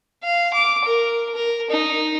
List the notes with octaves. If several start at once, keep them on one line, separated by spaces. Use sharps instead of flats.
F5
D6
A#4
A#4
D#4